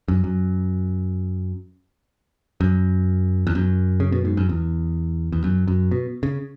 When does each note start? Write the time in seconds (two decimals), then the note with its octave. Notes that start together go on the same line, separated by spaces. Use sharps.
0.08 F#2
0.24 F#2
2.61 F#2
3.47 E2
3.55 F#2
4.00 C#3
4.12 B2
4.25 G#2
4.37 F#2
4.49 E2
5.32 E2
5.44 F#2
5.68 F#2
5.91 B2
6.23 C#3